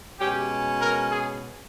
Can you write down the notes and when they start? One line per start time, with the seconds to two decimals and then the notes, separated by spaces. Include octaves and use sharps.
0.19 B2 G#3 C#4 G4
0.82 A#4
1.12 G#4